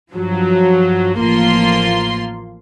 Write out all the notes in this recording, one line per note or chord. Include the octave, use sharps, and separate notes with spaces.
G2 F3 F#3
A1 F3 A#3 F4 C6